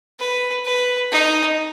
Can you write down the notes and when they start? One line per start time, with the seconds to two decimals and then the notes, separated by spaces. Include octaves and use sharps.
0.20 B4
0.65 B4
1.11 D#4